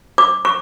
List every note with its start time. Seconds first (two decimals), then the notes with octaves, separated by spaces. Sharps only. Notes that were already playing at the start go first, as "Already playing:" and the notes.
0.18 D6
0.45 C#6